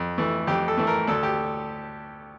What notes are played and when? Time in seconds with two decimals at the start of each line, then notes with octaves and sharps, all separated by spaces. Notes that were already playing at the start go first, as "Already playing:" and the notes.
Already playing: F2
0.18 E3 A3
0.47 F2 G4
0.68 A4
0.78 E3 A3
0.87 A#4
1.08 D2 A4
1.23 G4